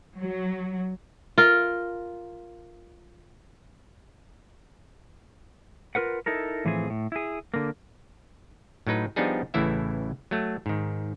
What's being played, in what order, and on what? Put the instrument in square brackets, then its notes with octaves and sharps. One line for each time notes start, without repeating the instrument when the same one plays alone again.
[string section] F#3
[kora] F4 A#4
[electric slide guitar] F4 F#4 A#4 B4 F#5
D#4 E4 A4 A#4
A2 E3 F3 C4 G#4
A2
E4 G#4
D3 A#3
[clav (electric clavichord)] A2 F#3 D#4 B4
F3 G3 B3 D4 D#4 G#4
A1 A2 C#3 E3 E4 E5
F#3 A3
G#2 D#3